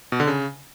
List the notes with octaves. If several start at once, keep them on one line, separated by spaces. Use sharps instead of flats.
B2
D3
C#3